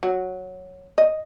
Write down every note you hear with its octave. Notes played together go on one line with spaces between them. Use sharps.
F#3
D#5